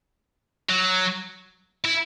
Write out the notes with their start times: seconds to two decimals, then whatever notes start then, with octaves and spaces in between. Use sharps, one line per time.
0.70 F#3
1.85 E4